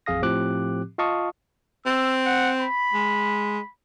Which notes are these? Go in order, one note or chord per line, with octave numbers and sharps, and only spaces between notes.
A1 F2 G#4 F5 D#6 A#6
A2 F3 C4 G4 D6 F#6
F4 D#5 F5 A5 C#6 D#6
C4 E6
F#5
B5
G#3